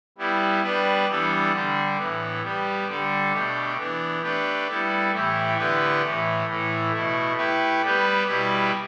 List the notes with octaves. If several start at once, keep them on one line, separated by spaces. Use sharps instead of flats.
G3 B3 E4
G3 B3 D4 B4
E3 G3 B3 D4 A4
D3 G3 D4
A2 E3 B3
G3 B3 G4
D3 G3 D4 A4
B2 A3 D4 G4
E3 B3 D4
A3 D4 G4 B4
G3 B3 E4 A4
A2 E3 A3 E4 G4
D3 B3 E4 G4 B4
A2 E3 A3
A2 E3 A3
B2 A3 E4
A3 E4 G4 B4
G3 B3 G4 B4
B2 G3 E4 G4 B4